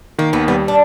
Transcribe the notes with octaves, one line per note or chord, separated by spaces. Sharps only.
D#3 A#3
D#2 B3
G3 B3
D4